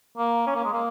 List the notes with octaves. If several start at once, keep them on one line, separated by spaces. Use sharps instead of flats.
A#3
C#4
A#3
G#3
A#3